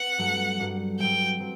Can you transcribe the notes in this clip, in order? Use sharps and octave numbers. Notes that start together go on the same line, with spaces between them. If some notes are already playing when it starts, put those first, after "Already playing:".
Already playing: C4 B4 F#5
G2 F#3 A3 D4
G2 F#3 A3 D4
G2 F#3 C4 G5
F#3 C4